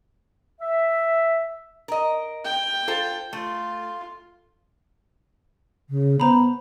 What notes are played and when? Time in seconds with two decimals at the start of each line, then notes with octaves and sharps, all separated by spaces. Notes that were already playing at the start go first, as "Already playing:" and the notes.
0.61 E5
1.88 A#4 D#5
2.45 G5
2.88 F4 A4 C5
3.33 A3 F4
5.90 C#3
6.20 B3 C5 A#5 B5